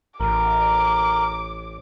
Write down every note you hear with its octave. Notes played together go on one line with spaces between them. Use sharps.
A1 A#4 D6